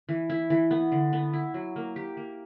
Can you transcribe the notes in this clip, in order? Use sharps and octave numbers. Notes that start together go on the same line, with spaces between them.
E3
E4
E3
B3
D3
B3
E4
F#3
A#3
G4
A#3